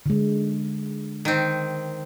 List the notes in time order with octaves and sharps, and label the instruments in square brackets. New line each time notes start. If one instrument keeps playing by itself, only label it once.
[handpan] D3 G#3
[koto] D#3 C4